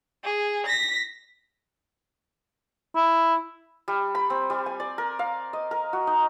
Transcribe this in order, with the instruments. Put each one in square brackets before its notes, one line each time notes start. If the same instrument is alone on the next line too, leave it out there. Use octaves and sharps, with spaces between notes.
[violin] G#4
A#6 B6
[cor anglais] E4
[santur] G3
B5
C4
G3
G#5
D5
A#4
F5
D#5
A#4
F#4
D#4